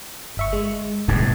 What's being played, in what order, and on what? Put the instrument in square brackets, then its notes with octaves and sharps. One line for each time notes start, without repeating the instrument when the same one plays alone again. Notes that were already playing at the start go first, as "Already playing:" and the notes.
[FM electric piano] G1 E5 C#6
G#3
[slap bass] D1 G2 B2